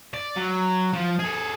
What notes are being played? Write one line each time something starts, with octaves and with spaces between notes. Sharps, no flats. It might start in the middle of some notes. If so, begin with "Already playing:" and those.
D5
F#3
F3
G#4 A4